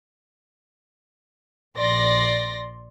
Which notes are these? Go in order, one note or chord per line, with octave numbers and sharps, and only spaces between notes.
A#1 D5 C6 A#6